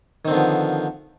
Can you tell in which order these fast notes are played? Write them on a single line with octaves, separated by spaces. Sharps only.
D#3 C4 D3 B3 F3